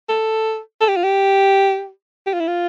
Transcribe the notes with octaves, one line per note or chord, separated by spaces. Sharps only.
A4
A4
G4
F4
G4
G4
F4
E4
F4